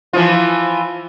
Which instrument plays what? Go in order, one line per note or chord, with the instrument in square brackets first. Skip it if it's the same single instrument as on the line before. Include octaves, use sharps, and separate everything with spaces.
[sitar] E3 F3 F4